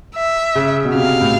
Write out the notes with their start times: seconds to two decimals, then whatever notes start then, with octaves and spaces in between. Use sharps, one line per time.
0.16 E5
0.55 C#3
0.85 B2
0.95 C3 F5
1.21 A2